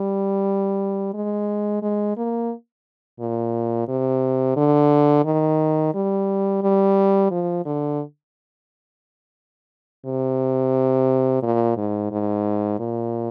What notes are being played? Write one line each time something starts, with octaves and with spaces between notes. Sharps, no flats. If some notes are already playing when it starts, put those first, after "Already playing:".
Already playing: G3
G#3
G#3
A#3
A#2
C3
D3
D#3
G3
G3
F3
D3
C3
A#2
G#2
G#2
A#2